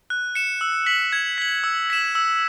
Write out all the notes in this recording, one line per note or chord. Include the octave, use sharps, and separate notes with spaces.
F#6
C#7 E7
E6
B6 F#7
G#6
B6 F#7
E6
B6 E7
E6